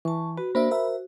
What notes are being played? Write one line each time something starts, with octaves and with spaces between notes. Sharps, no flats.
E3 A5 C#6
F#4 B4
A#3 D4 C5 E5 B5
F#4 A#4 E5